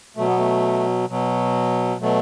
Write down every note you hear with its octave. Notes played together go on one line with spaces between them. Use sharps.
B2 F#3 A3
B3
A3
B2 F#3
B2 F#3 A3